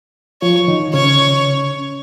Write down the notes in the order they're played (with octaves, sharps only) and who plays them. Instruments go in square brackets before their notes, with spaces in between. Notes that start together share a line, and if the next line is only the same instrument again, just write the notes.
[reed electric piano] F3 F4 [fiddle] C#5
[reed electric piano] D#3 D#4
[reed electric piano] C#3 C#4 [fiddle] C#5